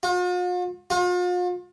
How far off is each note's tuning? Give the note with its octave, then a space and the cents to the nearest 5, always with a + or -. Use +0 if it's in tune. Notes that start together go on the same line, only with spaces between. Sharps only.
F4 +45
F4 +40